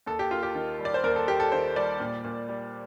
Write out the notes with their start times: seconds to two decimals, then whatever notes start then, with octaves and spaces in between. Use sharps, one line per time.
0.06 D#2 A4
0.19 G4
0.31 A#3 F4
0.43 G4
0.55 D#3
0.79 G3
0.85 D5
0.94 C5
1.03 D#2 A#4
1.16 A4
1.28 A#3 G4
1.40 A4
1.52 D#3 C5
1.76 G3 D5
2.00 A#2
2.24 A#2
2.49 G3